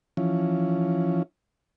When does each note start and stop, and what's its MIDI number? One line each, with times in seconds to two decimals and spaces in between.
0.17 1.23 52
0.17 1.23 53
0.17 1.23 61